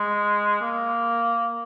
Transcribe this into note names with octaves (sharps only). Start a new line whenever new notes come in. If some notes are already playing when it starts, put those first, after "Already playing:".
Already playing: G#3
A#3